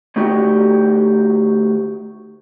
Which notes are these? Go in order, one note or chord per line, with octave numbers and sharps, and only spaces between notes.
D2 A3 D#4 F#4 G4 D5